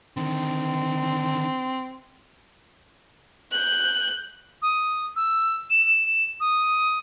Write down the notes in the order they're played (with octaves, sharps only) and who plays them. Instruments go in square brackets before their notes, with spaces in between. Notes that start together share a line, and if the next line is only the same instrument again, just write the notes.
[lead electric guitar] D3 D#3 [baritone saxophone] C4
[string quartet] F#6 G6
[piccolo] D#6
E6
E7
D#6